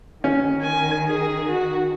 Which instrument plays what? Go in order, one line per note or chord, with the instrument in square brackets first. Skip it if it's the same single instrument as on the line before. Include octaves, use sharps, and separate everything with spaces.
[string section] D#3 [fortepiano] C#4
[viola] G#5
G#4
F#4